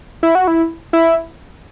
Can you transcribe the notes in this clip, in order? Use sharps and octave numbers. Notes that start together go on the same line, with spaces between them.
E4
F#4
E4
E4